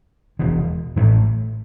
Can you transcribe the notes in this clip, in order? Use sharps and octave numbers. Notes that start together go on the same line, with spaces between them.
E1 E2 B2
A1 A2 E3 A3